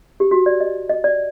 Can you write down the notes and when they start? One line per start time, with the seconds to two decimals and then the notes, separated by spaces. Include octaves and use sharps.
0.20 G4
0.31 F#4
0.46 D5
0.60 D#5
0.89 D#5
1.04 D5